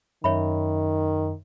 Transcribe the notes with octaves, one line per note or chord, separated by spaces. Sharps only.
F#2 D#3 C#5 E5 B5